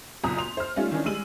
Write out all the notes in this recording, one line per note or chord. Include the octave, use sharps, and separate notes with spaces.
F#1 B1 A#2 A#5 D#6
C6 F7
C5 F6
G3 A3 C#4 D#4 F4
D#3 E3 C#4 D4
G3 G#3 E6 D#7 F#7